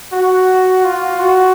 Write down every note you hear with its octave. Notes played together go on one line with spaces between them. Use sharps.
F#4
F4
F#4